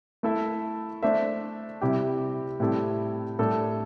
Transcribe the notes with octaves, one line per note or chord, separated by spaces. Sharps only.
A3 E4 A4 E5
A3 D4 C5 E5
C3 G3 E4 G4
A2 G3 C4 E4 A4
A2 G3 D4 A4